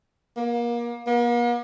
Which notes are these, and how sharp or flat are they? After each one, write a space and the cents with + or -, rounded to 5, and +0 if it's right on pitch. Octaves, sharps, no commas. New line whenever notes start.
A#3 +30
A#3 +45